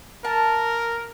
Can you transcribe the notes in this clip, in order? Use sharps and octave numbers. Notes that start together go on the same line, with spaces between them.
A#4 A5